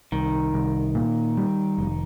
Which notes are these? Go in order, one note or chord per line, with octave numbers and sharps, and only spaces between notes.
C2 D#3
C2
A#2
G3
F1